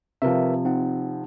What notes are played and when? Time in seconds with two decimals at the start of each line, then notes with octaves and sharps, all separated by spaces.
0.22 C3 F3 A#4 B4 E5
0.65 C4 D#4 F#5